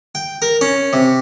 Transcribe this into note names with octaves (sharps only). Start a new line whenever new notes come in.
G5
A#4
C#4
C3